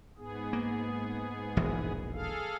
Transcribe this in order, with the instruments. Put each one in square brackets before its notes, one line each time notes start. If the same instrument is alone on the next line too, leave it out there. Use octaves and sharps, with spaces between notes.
[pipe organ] G#2 B3 G#4
[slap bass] A#3
E1 A#1 E3
[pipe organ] G#4 A4 F5